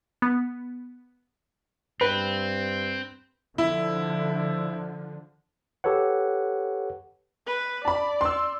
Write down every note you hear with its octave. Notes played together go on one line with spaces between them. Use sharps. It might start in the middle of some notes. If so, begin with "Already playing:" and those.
B3
G2 C4 B4
D3 F3 E4
G4 A4 B4 C#5 F#5
B4
D5 A5 B5
C6 E6